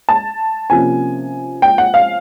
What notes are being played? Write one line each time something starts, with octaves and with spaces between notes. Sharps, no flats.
A5
C3 F3 A#3 C#4 G#5
G5
F#5
F5